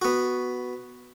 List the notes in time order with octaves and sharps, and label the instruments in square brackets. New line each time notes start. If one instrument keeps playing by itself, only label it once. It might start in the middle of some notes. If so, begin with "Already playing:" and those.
[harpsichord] B3 F#4